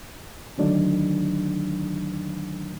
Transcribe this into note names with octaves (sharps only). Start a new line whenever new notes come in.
D3 D#3 F#3 A3 D4 D#4